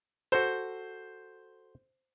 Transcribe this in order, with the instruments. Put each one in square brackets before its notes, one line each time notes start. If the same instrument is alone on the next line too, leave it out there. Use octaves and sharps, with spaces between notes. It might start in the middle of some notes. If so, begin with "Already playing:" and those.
[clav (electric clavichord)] F#4 A4 [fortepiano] C5